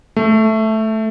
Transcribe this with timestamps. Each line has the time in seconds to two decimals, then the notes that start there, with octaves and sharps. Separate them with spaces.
0.16 A3